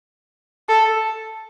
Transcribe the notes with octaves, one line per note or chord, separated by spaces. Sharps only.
A4